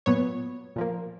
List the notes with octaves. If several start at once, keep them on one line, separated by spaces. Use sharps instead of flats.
A#2 F#3 B3 C#5
A#2 F3 A#3